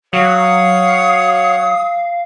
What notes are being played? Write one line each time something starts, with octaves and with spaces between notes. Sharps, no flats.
F#3 C#5 F5 F#5 D#6